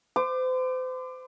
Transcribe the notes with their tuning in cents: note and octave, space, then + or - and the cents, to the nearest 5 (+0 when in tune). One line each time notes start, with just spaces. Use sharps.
C5 -40 D6 +20